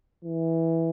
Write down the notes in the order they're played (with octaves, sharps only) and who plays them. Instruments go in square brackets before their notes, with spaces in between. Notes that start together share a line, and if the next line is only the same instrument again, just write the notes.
[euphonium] E3